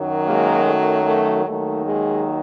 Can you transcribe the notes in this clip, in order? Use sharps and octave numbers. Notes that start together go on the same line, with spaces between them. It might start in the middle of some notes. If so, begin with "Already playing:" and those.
Already playing: F#2 D#3 F#3
G#3 A#3
A3
A3
D#2 D#3 F#3 A3
G#3